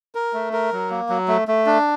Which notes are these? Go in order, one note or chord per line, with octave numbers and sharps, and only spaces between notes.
A#4
A3
A#4
F#3
A#3
F#3
A3
A3
D4